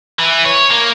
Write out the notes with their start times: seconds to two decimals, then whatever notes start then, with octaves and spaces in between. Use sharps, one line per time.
0.20 E3
0.45 C#5
0.71 A#3